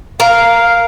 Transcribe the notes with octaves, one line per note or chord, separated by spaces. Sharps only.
A#4 F5